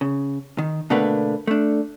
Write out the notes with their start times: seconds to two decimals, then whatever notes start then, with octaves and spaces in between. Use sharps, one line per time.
0.01 C#3
0.58 D#3
0.90 B2 D3 A3 A#3 D4 B4
1.47 A3 D4